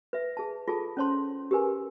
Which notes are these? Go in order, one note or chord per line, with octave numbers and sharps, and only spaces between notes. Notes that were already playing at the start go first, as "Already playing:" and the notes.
B4 E5
G#4 A5
F4 G#4 A4 A5
C#4 C5 C#5 A5 C6
G4 G#4 A#4 B4 G#5